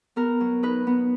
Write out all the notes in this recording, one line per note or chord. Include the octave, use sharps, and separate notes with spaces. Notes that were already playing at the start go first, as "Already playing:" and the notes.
B3 A#4
F#3
D#4 B4
B3